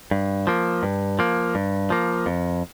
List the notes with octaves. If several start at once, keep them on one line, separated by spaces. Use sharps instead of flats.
G2
F3 A#3
G2
F3 A#3
G2
F3 A#3
F2